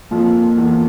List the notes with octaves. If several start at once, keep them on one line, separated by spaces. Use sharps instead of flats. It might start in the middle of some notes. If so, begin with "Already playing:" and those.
F2 F3 A#3
E2 E3